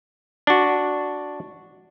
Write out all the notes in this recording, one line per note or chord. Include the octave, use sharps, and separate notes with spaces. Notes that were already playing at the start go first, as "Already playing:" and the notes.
D4 F#4